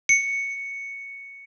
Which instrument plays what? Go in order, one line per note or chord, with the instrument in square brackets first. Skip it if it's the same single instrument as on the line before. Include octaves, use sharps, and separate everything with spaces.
[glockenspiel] C#7